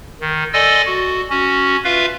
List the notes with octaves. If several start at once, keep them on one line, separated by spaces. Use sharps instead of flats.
D#3
A4 D5 D#5 G#5 C6 E6
F#4
C#4 F#4
F4 B4 E5 F5